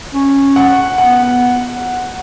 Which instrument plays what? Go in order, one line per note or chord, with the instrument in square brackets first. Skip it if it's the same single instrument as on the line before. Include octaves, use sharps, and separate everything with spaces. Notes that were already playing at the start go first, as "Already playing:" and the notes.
[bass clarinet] C#4
[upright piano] F#5
[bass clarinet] B3 [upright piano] F#5